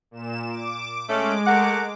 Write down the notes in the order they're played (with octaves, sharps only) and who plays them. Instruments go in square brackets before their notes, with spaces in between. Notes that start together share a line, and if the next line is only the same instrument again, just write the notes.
[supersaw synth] A#2 E7
D6
[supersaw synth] G#3 D6 [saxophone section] A3 C#4
[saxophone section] A3 A#4 F#5